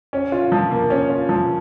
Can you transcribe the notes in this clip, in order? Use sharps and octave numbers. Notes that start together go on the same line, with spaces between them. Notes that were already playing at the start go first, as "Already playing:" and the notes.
C#4
F4
F3
A#3
C#4
F4
F3